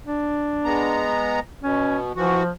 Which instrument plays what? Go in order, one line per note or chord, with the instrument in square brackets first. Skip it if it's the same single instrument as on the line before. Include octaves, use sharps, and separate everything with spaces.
[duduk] D4
[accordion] G#3 B3 A#5
[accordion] B2 [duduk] C#4
[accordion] E3 F#4 [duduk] F3